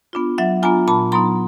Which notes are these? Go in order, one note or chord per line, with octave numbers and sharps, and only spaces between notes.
B3 D4 F4
F#3 E5 F#5
B3 D4 F4 G#5 A#5
A#2 A5 B5
F#3 B3 D#4 A#5 C6